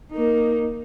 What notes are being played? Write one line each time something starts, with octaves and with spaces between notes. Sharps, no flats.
A#3 D#4